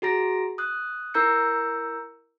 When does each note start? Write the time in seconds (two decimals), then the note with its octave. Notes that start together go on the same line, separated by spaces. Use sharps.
0.02 F#4 G#4 A#5 A#6 D7
0.58 D#6 F#6
1.14 E4 A#4 A#5 E6 G6 C#7